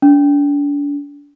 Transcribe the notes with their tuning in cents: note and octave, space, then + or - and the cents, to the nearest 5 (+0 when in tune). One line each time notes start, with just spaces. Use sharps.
D4 -40